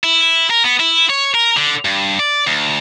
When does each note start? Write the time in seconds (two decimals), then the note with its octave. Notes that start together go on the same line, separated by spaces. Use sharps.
0.04 E4
0.50 A#4
0.64 B3
0.80 E4
1.10 C#5
1.34 A#4
1.57 D3
1.85 G2
2.19 D5
2.47 D2